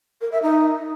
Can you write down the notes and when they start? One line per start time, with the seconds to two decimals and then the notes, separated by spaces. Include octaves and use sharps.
0.21 A#4
0.32 E5
0.43 D#4